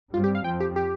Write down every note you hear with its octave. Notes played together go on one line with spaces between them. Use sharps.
G2 G3 C4 F4
G4
F5
F2 F3 C4 G5
G4
G4